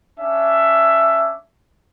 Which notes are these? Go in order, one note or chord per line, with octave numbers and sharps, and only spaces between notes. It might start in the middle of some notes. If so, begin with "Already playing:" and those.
C#4 D4 E5